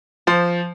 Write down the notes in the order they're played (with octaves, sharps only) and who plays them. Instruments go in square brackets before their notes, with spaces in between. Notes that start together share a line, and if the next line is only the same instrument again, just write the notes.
[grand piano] F3 [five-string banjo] C5